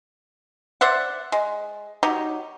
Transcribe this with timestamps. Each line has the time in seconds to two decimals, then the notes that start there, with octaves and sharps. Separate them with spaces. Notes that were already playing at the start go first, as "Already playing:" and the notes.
0.81 C5 D5 E5 F#5
1.32 G#3
2.03 F#3 D#4 G4